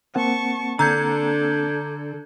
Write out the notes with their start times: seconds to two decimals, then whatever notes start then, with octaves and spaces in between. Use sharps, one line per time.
0.15 A#3 C4 F#5 A5 C#6
0.79 D3 D4 A4 A#5 G6 G#6